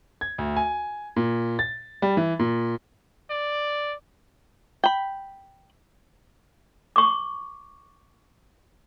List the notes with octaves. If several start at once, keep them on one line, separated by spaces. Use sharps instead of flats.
G#6
D2
G#5
A#2
A6
G3
E3
A#2
D5
G5 B5
C#6 D6